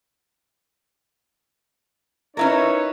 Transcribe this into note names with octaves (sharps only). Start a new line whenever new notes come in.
C#4 D#4 E4 A#4 B4 C#5